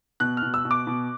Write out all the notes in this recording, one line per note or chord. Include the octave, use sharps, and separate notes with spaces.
B2 F#6
F6
B2
E6
B2
D6
B2